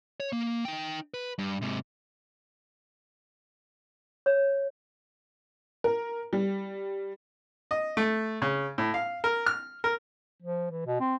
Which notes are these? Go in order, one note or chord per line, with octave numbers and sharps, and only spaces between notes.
C#5
A#3
D#4 G5
B4
G2
G#2 C3
C#5
A#4
G3
D#5
A3
C#3
A2
F5
A#4
F6
A#4
F3
E3
B2
C4